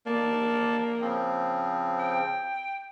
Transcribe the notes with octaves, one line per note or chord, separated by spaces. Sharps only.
A#3 D5 A5
C#3 F3 C4
G5